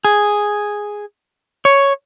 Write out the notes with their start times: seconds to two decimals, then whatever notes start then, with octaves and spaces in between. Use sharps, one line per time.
0.05 G#4
1.65 C#5